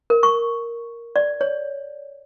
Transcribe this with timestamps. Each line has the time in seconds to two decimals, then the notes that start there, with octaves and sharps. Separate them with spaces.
0.10 A#4
0.23 C#6
1.16 D5
1.41 C#5